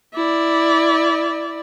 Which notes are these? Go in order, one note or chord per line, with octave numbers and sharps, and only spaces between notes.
E4 D5